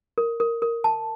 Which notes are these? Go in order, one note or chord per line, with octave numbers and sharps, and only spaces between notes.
A#4
A#4
A#4
A5